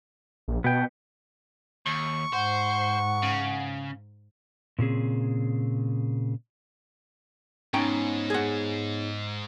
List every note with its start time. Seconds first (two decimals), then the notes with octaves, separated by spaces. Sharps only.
0.48 A#1
0.64 B2 B3 G5
1.86 D#2 C#6
2.33 G#2 C5 F#5
3.23 C#3
4.79 A#2 C#3 C4 G#4
7.74 G#2 B3 C#4 D#4 C#5 G5 A#5
8.30 G#4 F#5